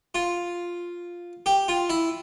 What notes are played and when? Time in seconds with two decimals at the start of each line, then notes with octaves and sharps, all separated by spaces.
0.15 F4
1.46 G4
1.68 F4
1.90 E4